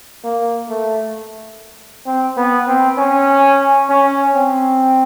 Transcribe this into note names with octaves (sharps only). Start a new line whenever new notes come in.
A#3
A3
C4
B3
C4
C#4
C#4
C4